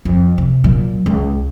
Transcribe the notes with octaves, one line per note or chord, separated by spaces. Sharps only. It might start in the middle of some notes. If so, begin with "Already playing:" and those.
F2
C3
A#2 F#3
C#2